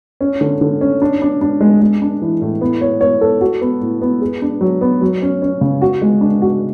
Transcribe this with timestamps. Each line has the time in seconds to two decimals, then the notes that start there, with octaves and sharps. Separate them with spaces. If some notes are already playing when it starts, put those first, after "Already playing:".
0.21 C#4
0.41 D3
0.61 D3
0.81 C#4
1.02 D4
1.22 D4
1.41 D4
1.61 G#3
1.82 G#3
2.02 D4
2.22 E3
2.42 A2
2.61 B3
2.81 C#5
3.01 C#5
3.21 A4
3.41 F#4
3.61 B3
3.81 A2
4.01 B3
4.22 G#4
4.42 D4
4.61 F#3
4.81 B3
5.01 F#3
5.22 C#4
5.42 C#4
5.61 C#3
5.82 F#4
6.02 G#3
6.21 D4
6.42 F#4